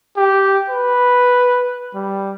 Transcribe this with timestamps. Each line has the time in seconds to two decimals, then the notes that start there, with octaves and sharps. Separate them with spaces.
0.17 G4
0.70 B4
1.95 G3